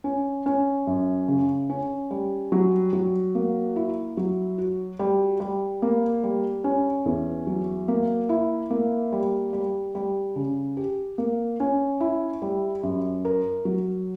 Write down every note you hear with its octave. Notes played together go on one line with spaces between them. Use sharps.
C#4
C#4
F#2
C#3
C#4
G3
F#3
F#3
A#3
E4
F#3
F#4
G3
G3
A#3
G3
C#4
E2
F#3
A#3
E4
A#3
G3
G3
G3
C#3
G4
A#3
C#4
E4
G3
F#2
A#4
F#3